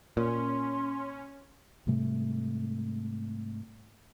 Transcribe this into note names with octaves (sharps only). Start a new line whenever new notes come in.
A#2 C#4 C6
G#2 C3 G3 A3